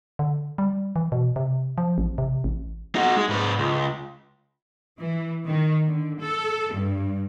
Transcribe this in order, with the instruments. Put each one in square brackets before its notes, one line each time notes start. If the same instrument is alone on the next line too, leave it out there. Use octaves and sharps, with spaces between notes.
[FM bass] D3
G3
E3
B2
C3
F3
A1
C3
A1
[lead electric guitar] D#4 F#4
G#3
G#2 B4
C#2
[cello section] E3
D#3
D3
A4
G2